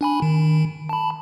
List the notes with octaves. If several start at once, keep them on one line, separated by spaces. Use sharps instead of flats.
D4 G#5 B5
D#3
A5 B5